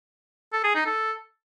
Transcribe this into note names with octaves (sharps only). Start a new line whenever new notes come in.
A4
G#4
D#4
A4